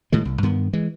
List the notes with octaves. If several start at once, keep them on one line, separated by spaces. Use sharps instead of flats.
A2 D#3 G#3
C2
G2 D#3 B3
E3 G#3